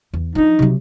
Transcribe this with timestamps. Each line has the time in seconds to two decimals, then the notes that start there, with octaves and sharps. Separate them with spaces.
0.13 E2
0.35 F3 D4 D#4
0.59 C3 F#3